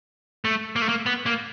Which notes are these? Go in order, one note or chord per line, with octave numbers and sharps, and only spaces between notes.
A3
A#3
A3
A#3
B3
A#3